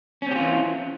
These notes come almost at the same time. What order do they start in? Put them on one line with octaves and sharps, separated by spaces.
C#4 C4 G4 F4 E3